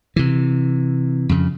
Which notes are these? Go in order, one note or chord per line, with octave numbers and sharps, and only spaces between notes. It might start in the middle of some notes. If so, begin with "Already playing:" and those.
C3 E3
F2 C#3